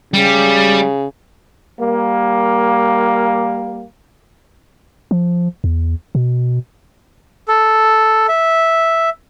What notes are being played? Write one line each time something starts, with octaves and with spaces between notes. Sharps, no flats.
C#3 G3
G3 A#3
F3
E2
B2
A4
E5